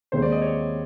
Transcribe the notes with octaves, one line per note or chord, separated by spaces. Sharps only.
D#2 D#3 G#3 C4 C5
D5
D#5
C#5